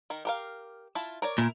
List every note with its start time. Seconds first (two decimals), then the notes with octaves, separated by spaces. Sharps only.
0.10 D#3 A#4
0.25 G4 A#4 F5
0.95 E4 F4 A5
1.22 A#4 C#5 D5
1.38 A#2 E4 A#4